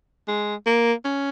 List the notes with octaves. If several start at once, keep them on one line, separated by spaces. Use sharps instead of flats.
G#3
A#3
C#4